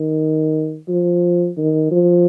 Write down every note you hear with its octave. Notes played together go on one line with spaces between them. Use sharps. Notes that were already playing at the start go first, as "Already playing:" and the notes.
Already playing: D#3
F3
D#3
F3